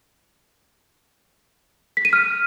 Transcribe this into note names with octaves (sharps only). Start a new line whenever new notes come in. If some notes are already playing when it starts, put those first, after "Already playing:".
B6
D#7
F6